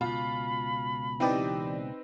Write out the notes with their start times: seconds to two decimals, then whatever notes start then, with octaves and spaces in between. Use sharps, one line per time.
0.01 C#2 G#2 B2 F4 B5
1.20 E3 C4 D#4 G4 B4 D5